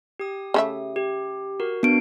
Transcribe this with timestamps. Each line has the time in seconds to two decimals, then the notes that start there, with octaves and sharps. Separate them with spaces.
0.19 G4 D#6
0.54 C#3 A3 E5
0.96 G4
1.60 F#4 A#4
1.83 B3 D4 F#4 D7